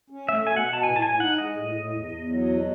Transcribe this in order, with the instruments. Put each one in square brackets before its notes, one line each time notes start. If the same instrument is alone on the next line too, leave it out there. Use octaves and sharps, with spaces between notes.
[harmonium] C#4
[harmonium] A3 [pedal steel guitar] E5
[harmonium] B2 [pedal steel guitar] G#5
[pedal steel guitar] F#5
[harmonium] B2
[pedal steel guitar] A5
[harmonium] A2 [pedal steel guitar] G#5
[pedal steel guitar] A5
[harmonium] A2 [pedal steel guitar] G#5
[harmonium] D#4 [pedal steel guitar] F#5
[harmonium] G#3 [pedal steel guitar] D#5
[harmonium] A2
A2
E2
E2
F#3
B2